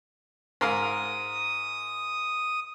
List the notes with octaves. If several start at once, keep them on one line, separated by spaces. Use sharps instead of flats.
G#2 A#4 F5 D#6